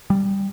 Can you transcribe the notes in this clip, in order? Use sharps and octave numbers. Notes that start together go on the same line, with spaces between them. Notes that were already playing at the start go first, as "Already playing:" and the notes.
G3